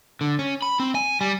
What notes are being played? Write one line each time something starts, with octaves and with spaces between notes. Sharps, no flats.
D3
C#4
B5
C4
G#5
G3